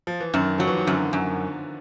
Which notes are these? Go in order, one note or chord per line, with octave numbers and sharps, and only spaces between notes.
F3
E3
F#2 D#3
F3 F#3
E3
D#3
F#2 D3
F#2